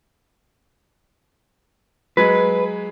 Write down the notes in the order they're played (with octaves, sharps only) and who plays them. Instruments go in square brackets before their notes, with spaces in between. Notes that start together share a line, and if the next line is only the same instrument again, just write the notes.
[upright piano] F#3 G#3 [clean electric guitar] B4